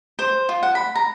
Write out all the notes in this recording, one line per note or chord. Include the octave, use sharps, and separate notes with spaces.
C5
F4
F#5
B5
A#5